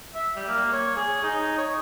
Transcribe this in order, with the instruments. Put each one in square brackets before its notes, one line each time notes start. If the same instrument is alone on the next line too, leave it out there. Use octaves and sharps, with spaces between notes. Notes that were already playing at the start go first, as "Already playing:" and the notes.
[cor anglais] E5
G3
A#3
C#5
G#4
D#4
C#5